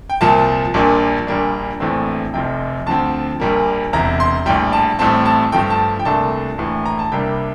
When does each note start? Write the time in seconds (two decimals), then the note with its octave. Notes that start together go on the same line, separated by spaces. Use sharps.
0.10 G5
0.21 C2 A#2 F3 A5
0.74 A#1 A#2 G3 A#3 D4
1.27 A#1 A#2 G3 A#3 D4
1.80 A#1 A2 E3 A3 C4
2.34 F1 F2 C3 G5
2.86 D2 D3 F3 C4 A5
3.40 A#1 A#2 G3 A#3
3.93 E1 E2 C3 A#5
4.20 C6
4.46 A#1 A2 G3 G5
4.73 A5
4.99 A1 A2 G3 C4 A5
5.26 A5
5.52 G2 F3 A3 G5
5.70 A5
5.99 G5
6.05 C2 A#2 A3 D4 A5
6.58 A#1 A2 E3
6.86 A#5
6.99 A5
7.12 C2 C3 G3 A#3 D4 G5